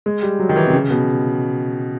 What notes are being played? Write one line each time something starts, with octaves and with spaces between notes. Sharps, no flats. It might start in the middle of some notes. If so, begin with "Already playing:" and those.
G#3
G3
F#3
D#3
E3
C3
C#3
B2